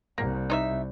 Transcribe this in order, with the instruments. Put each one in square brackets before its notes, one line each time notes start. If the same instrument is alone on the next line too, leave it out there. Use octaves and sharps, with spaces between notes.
[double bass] C2 [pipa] A#3
[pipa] D#4 C#5 E5